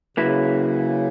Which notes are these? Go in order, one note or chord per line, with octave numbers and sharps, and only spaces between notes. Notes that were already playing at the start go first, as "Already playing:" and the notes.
C#3 F#3 A#3 E4 B4